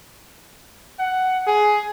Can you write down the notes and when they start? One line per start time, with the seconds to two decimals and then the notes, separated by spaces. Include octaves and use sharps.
0.99 F#5
1.47 G#4